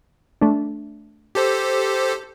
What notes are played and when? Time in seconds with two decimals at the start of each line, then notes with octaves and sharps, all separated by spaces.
0.41 A3 D4
1.35 G4 A4 C5